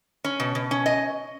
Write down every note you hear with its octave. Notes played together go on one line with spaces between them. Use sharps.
C#4
B2
B2
C#4
D#5